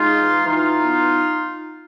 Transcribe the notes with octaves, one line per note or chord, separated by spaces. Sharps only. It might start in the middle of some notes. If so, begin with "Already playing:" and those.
Already playing: G#3 D#4 F4
E3
E3 D#4 F4
B3